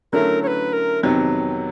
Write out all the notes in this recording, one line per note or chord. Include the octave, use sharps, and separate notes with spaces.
D3 F#3 A3 C#4 E4 A#4
C#5
B4
A#4
F2 C3 D#3 F#3 B3